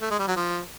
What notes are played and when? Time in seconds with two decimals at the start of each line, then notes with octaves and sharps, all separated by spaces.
0.02 A3
0.11 G#3
0.19 G3
0.28 F#3
0.36 F3